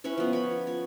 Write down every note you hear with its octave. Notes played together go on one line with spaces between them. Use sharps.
C#4 E4 B4 C#5
F3 B3
C#5 B5
C#5